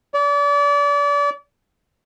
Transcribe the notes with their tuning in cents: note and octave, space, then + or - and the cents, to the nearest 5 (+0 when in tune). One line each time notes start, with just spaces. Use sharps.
D5 -35